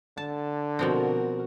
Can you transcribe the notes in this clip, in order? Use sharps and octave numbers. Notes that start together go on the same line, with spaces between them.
D3 A5
B2 F3 C4 F#4 A#4